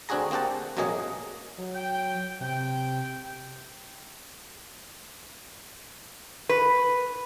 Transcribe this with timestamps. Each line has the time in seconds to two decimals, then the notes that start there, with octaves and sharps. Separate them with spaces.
0.09 D2 C4 D4 F#4 G#4 A#5
0.31 A#3 C4 G4 F#5 A5
0.77 A1 B2 F#3 A#3 G#4 D#5
1.58 F#3
1.75 G5
2.41 C3 G5
6.49 B4